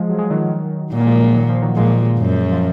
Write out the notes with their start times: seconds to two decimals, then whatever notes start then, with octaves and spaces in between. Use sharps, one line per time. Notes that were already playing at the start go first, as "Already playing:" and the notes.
Already playing: F3 G#3
0.09 F#3
0.19 G#3
0.30 D#3 F#3
0.93 A#2 D#3 F#3
1.00 A#3
1.06 F3 G#3
1.20 F#3 A#3
1.35 D#3 F#3
1.49 F3
1.62 D#3 F#3
1.76 A#2 F3 G#3
2.18 F#2
2.52 F3